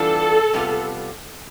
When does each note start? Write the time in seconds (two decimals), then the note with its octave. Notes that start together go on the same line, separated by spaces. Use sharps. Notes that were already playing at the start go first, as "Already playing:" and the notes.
Already playing: E3 G3 B3 D4 F4 A4
0.53 C3 G3 B3 F4